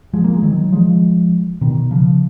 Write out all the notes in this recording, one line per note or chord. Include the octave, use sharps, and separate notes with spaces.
F3 G#3
A#3
G#3
D#3 F#3
F3 G#3
B2 D#3
C#3 F3